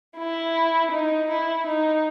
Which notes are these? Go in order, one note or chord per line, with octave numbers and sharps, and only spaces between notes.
E4
D#4
E4
D#4